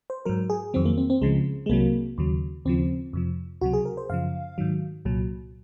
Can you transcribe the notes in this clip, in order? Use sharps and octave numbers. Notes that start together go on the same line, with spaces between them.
C5
G#2 F#3 A#4
G#4
F2 D#3 F#3 C4
A#3
C4
C4
C#2 C#3 F3 G#3
G#3
C2 C3 F#3 A#3
D#2 C#3 F#3
D#2 C#3 F3 C4
F2 C3 F3
C#2 C3 F#3 F#4
G#4
A#4
C5
F#2 C#3 F3 F5
G#2 D#3 F#3
C2 A#2 F#3